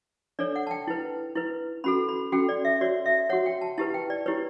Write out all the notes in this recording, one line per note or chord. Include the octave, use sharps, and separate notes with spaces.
D4 A4 C#5 D5
F#5
A5
G5
E4 B4
E4 B4
C#4 F#4 A4 B5
B5
C#4 F#4 A4 G5
D5
E5
F#4 C#5 D5
E5
F#4 C#5 F#5
G5
A5
E4 G4 B4 A5
G5
D5
E4 G4 B4 C#5